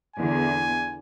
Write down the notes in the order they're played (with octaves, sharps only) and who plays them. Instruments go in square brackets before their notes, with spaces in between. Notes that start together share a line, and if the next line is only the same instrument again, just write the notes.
[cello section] E2 D3 [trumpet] G#5